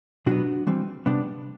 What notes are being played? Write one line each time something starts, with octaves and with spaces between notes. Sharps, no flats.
B2 F#3 B3 D4 F#4
E3 G3 C4
C3 G3 B3 D4